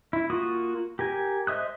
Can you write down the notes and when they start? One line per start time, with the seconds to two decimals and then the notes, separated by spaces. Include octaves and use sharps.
0.13 E4
0.30 A#3 F4 F#4 D#6
0.99 G4 A#4 G#5
1.47 C5 D#5 E5 D#6 F#6